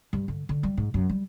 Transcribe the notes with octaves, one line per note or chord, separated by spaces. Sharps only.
G2
D3
D3
G3
G#2
F#2
G3